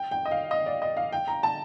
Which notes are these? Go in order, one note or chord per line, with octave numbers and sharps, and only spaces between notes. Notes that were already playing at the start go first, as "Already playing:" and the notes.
Already playing: G5
G5
D#5
F5
D#5
D5
D#5
F5
G5
A#5
A5